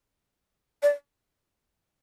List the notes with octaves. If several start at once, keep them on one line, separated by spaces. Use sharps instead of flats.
D5